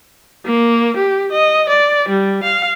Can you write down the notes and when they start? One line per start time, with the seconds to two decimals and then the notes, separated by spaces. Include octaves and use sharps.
0.45 A#3
0.97 G4
1.32 D#5
1.69 D5
2.09 G3
2.44 F5